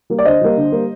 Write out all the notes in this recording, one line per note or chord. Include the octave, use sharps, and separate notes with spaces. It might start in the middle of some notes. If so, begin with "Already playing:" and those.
G3 A#3
D5
D3 C5 D#5
G3 A#3
D3
G3 A#3